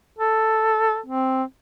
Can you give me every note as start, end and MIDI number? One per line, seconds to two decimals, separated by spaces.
0.18 0.98 69
1.06 1.43 60